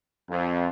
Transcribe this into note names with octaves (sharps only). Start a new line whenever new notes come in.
F2